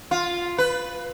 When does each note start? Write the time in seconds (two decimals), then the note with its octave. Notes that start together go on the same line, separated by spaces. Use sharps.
0.11 F4
0.58 B4